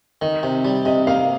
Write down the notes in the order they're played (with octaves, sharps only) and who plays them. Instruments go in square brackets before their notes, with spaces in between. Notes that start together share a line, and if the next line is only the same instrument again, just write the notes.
[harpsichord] D#3 [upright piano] D#5
[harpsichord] C3
G3
[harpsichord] C3 [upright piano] D#5
[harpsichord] A#3 [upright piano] F5